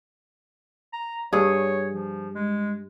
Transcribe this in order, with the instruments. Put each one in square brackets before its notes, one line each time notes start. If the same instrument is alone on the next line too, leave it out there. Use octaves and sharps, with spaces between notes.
[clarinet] A#5
[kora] G2 G#4 [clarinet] C#5
[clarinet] F3
G#3